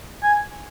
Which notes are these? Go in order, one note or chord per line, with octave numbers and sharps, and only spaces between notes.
G#5